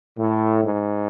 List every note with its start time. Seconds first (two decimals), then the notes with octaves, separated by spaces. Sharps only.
0.18 A2
0.63 G#2